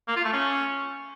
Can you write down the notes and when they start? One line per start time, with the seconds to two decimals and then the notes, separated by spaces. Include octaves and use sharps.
0.08 A#3
0.16 F4
0.25 A3
0.33 C#4